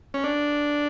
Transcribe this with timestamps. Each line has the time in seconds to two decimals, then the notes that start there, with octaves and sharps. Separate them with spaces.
0.14 C#4
0.24 D4